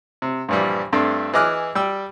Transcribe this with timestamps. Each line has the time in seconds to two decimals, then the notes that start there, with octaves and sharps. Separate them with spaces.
0.22 C3
0.49 G2 A#2 E3 F3 G3
0.93 G2 A3 C4 D4
1.34 E3 G#4 D#5 D6 F6 F#6
1.75 G3 G5 E6